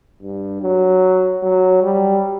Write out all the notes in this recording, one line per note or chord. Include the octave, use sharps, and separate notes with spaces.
G2
F#3
F#3
G3